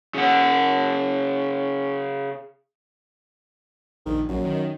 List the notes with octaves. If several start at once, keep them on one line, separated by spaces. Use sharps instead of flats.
C#3 F#5
A#1 D#3
A#1 F#2
D#3